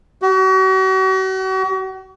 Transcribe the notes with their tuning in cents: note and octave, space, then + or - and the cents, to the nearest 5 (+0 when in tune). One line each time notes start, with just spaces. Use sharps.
F#4 +40